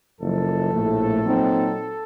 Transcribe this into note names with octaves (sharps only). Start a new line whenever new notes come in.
F#1 F#2 F3 A4
A#1 A2 A3
A#2 F#3 C4 D#4